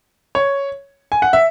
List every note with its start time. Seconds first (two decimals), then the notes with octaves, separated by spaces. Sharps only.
0.35 C#5
1.12 G#5
1.22 F#5
1.33 E5